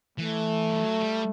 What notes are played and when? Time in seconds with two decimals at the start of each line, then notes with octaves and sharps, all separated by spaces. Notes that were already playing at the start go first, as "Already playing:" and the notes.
0.18 E3 A3
0.69 G3
0.79 F#3
0.99 G3